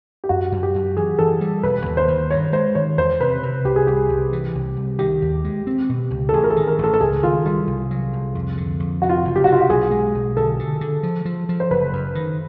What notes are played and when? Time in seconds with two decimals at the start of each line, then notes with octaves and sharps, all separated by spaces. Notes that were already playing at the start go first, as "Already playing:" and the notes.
0.24 G4
0.29 F#2 F#4
0.52 F#2
0.63 G4
0.74 F#2
0.97 E3 G#4
1.19 E3 A4
1.41 G3
1.63 E1 B4
1.86 D#2
1.97 C5
2.08 D#3
2.31 G2 C#5
2.52 G#3 C5
2.75 D#3 C#5
2.98 E2 C5
3.20 C3 B4
3.43 C3
3.65 C2 G4
3.76 G#4
3.87 C2 G4
4.09 C2
4.33 E3
4.55 C2
4.77 C2
4.99 D#3 G4
5.22 D#2
5.45 G#3
5.67 C4
5.89 B2
6.11 C#2
6.29 A4
6.33 A1 G#4
6.43 A#4
6.50 A4
6.56 D#3
6.67 A#4
6.78 A1
6.84 A4
6.94 A4
7.00 C#2 G#4
7.23 D#3 F4
7.45 G3 F4
7.67 C2
7.91 F#3
8.13 C2
8.35 F2
8.57 D3
8.80 F2
9.02 C3 F#4
9.09 F4
9.17 F#4
9.25 F#1
9.36 G4
9.44 C3 F#4
9.52 F4
9.61 F#4
9.69 B1 G#4
9.91 G#3
10.15 B1
10.37 D3 A4
10.59 D3
10.81 D3
11.03 F3
11.25 F3
11.49 F3
11.60 C5
11.71 F#1 B4
11.93 F#2
12.15 D#3